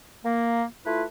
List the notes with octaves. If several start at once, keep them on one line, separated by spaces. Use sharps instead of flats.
A#3
A3 E4 F4 B4